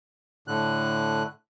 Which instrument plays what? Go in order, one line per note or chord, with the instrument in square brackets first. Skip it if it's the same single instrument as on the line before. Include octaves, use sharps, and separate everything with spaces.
[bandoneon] A2 D3 F#6